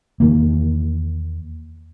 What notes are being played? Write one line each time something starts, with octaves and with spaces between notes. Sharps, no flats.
E2 D#3 A#3